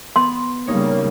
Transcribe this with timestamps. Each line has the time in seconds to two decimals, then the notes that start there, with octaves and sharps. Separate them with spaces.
0.16 B3 C6
0.67 C#3 G3 A#3 D#4 C#5